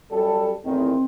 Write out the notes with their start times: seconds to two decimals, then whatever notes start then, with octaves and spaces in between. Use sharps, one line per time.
0.11 F#2 G3 A4
0.64 E2 A2 D#3 C4